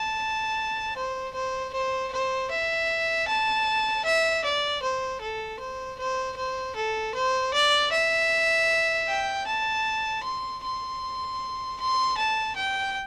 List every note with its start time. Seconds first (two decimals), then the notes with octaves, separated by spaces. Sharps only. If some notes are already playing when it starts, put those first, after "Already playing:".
Already playing: A5
0.96 C5
1.34 C5
1.73 C5
2.12 C5
2.50 E5
3.28 A5
4.05 E5
4.44 D5
4.82 C5
5.21 A4
5.60 C5
5.98 C5
6.37 C5
6.75 A4
7.14 C5
7.53 D5
7.91 E5
9.07 G5
9.47 A5
10.24 C6
10.63 C6
11.79 C6
12.17 A5
12.56 G5